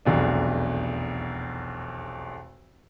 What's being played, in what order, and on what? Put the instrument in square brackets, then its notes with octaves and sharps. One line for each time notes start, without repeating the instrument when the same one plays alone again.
[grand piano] F1 B1 E2 D4